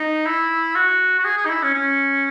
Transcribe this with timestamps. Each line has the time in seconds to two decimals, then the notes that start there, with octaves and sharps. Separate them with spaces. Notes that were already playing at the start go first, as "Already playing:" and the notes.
Already playing: D#4
0.26 E4
0.75 F#4
1.19 F#4
1.25 G#4
1.37 G#4
1.46 D#4
1.50 E4
1.63 C#4
1.74 C#4